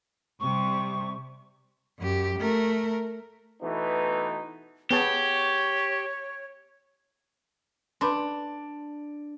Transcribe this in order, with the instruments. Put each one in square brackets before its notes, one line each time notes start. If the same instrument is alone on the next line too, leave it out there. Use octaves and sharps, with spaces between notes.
[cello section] C3 G3 [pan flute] C#6
[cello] F#2 G4
A3 A#4
[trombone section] B2 E3 A3 B3 D#4
[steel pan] B3 G#4 A5 [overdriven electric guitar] G4 [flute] C#5
[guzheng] D4 [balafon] B4 B5 C6